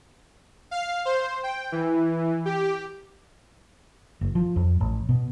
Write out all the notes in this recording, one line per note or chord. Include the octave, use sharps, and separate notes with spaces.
F5
C5
G5
E3
G4
F#1
F3
F2
A1
B2